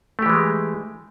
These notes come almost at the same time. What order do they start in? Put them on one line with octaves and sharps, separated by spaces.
A3 G4 E3 G#3